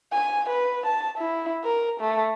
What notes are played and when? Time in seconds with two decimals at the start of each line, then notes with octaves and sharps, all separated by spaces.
0.13 G#5
0.49 B4
0.86 A5
1.18 E4
1.64 A#4
2.00 A3